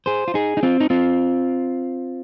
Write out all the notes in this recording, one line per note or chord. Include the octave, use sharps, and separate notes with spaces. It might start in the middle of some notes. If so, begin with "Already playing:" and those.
G#4 C5
F4
D#4 G#4
D#4
C4 F4
D#4
C4 F4